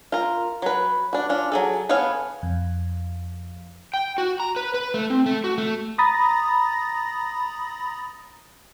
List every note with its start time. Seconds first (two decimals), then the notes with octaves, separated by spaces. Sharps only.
0.12 F4 A#4
0.62 F#3 B4
1.13 D4 F#4
1.29 C#4 D4 F4
1.52 F#3 G#4 A4
1.89 B3 G#4 A4 C#5 F5
2.43 F2
3.94 G5
4.18 F#4
4.40 A#5
4.56 B4
4.74 B4
4.94 A3
5.10 C4
5.26 A3
5.44 F#4
5.58 A3
5.98 A#5 B5 D#6 A6 A#6